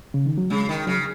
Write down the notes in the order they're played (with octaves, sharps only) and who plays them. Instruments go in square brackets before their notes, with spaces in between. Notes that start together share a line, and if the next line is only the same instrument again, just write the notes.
[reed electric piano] C#3
D#3
F#3
[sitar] C#3 [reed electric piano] G#3
[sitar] D#3
[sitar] C#3 [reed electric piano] F#3